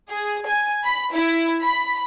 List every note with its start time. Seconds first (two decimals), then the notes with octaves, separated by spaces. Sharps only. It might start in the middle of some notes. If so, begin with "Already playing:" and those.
0.10 G#4
0.47 G#5
0.84 B5
1.13 E4
1.62 B5